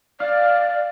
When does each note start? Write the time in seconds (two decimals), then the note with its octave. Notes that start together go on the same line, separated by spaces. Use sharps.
0.20 D5 F5